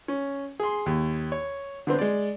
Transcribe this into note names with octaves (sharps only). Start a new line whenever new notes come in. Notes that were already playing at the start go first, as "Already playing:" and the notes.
C#4
G#4 C6
D#2
C#5
D3 B3 C4
G#3 D5